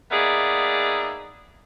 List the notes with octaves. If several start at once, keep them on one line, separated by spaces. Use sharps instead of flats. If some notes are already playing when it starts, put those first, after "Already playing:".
A#3 B3 D#4 G#4 D5 E5